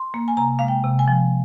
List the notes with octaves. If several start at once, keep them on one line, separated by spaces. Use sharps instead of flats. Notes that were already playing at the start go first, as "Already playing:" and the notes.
Already playing: C6
A#3
G#5
C3 A#5
G#3 F5
G5
C3
G#5
F3